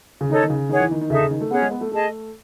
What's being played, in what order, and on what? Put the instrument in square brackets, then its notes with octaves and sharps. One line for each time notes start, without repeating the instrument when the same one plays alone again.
[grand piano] C#3
[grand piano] D#3 [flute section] D#4 A4 C#5
[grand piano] D#3
C#3
[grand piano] D#3 [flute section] G#4 C#5 F#5
[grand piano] E3
D#3
D#3
[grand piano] C#3 [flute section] D#4 A4 E5
[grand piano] C#3
D#3
A3
[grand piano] B3 [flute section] C#4 G#4 C#5 F#5
[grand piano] G#3
B3
A3
[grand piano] A3 [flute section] G#4 D#5 A5